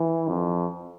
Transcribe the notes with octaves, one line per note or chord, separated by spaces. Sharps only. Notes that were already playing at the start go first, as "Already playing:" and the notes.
Already playing: E3
F2